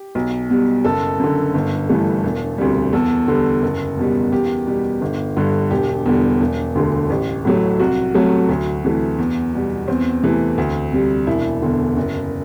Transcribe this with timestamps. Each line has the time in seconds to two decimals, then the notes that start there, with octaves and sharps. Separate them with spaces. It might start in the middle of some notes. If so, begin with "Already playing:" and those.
Already playing: G4
0.15 B1
0.50 B2 G3
0.85 F#1 A4
1.19 F#2 D3
1.54 G1
1.89 G2 E3 A3
2.23 E1
2.58 D2 C3 G3
2.93 E2 A4
3.28 D3 G3
3.62 F#1
3.97 E2 B2 G3
4.32 E2 G4
4.67 B2 G3
5.01 G1
5.37 G2 D3
5.71 E1 G4
6.06 E2 D3 G3
6.40 E1
6.75 D2 D3 A3
7.10 A1 G4
7.45 A2 F#3 A3
7.79 C2 F#4
8.15 C3 F#3 A3
8.49 D2
8.84 C3 E3 A3
9.19 E2
9.53 B2 G3
9.88 E2 C4
10.23 C3 E3 A3
10.58 D2
10.92 C3 G3
11.27 E1 E4
11.62 E2 D3
11.97 F#1